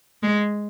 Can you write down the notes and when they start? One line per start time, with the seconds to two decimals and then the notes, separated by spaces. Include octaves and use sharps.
0.23 G#3